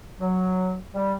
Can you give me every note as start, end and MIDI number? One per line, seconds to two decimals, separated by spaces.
0.20 0.75 54
0.95 1.14 55